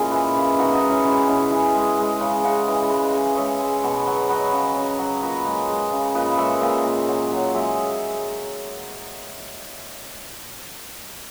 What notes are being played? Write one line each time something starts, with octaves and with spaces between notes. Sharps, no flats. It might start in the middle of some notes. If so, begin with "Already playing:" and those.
Already playing: A#2 G#3 C#4 E4
E3
C#3
B2 D#4 F#4
D#4 F#4
G#3
C#4 E4
G#3 C#4 E4
B2 C#4 E4
G#3 E4 G#4
G#3
G#3
C#3
C#3 D#5 F#5
E3
G#3
G#3
G#3 C#5 E5
G#3
B2
F#3
F#3 B4 D#5
C#3
C#3
F#3
A#2 B4 D#5
G#3
G#3
C#3
A#2 B4 D#5
G#3 C#5 E5
A#2 D#5 F#5
A#2
F#3
F#3
G#3 C#5 E5